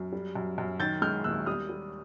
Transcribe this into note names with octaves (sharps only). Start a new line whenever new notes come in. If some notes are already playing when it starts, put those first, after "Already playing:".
Already playing: F#2
G3
F#2
F#2
D#3 G6 A6
G#3 F6 G6
D#2 E6 F#6
G3 D#6 F6
G3